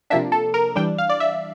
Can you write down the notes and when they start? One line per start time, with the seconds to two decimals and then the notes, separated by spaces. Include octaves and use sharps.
0.10 C3 F3 A#3 D4 E5
0.32 A4
0.54 A#4
0.76 E3 G3 D4 G5
0.98 F5
1.09 D5
1.20 E5